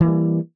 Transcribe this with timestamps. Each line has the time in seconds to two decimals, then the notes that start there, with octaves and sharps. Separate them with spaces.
0.01 E3
0.04 A#3
0.08 G3